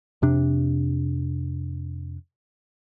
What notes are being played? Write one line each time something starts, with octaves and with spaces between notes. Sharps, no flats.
F2 C3 D4